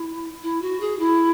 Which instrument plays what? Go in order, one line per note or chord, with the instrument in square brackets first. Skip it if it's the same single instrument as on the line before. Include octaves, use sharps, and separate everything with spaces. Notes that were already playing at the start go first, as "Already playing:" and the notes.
Already playing: [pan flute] E4
E4
F#4
G#4
E4